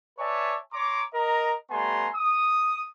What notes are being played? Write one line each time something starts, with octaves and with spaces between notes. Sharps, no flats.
B4 C#5 D5 E5 G#5 A5
C#5 A#5 C6 D6
A#4 D#5 A#5
G3 A3 B3 G#5 A#5 C6
D#6